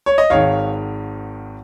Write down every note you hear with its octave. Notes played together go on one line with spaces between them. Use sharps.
C#5
D#5
G#1 G#2 D#3 C#5 F5